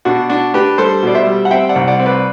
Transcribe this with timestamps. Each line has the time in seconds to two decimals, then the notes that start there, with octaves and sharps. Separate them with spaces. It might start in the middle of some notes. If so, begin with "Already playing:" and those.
0.05 B2 D4 F#4
0.29 D4 F#4
0.54 D4 G4 B4
0.78 G3 A4 C5
1.03 B2 D5
1.15 C5 E5
1.27 G3
1.45 F#5
1.51 C4 E5 G5
1.69 D5 F#5
1.76 C2
1.87 D5 F#5
1.99 C4
2.06 B4 D5